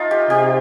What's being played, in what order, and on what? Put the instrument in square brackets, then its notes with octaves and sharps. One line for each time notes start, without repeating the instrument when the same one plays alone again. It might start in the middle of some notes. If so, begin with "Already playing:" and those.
Already playing: [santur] A3 D#4 F4
G4
[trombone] C3 [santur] G4